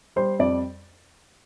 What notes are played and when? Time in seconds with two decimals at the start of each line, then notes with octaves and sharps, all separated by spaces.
0.16 G3 C5
0.39 F2 D5